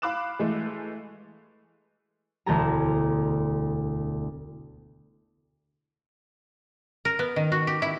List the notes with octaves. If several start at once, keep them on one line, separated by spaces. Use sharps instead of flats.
F5 B5 D6 F#6 E7
E3 G#3 A3
E1 D2 A3 A4 G#5 A#5
A#4
B3
D#3
F#4
G4
E4